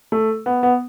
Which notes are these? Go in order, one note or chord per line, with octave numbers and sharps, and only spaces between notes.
A3
B3
B3